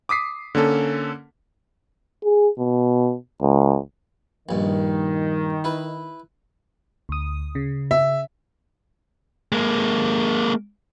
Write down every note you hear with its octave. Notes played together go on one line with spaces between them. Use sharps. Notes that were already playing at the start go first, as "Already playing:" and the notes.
D6 D#6 B6 C7
D3 A#3 C#4 A4
G#4
B2
C#2
A#1 G2 D#3
E4 B4
D2 D#6
C#3
E5
G#3 A#3